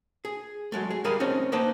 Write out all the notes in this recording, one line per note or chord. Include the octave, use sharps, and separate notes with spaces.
G#4
F#3 G#3 A3
G#4
G3 G#4 A#4 F5 G#5 B5
A3 C4 C#4 D#4
A#3 D#4 B4 C5 G5 A5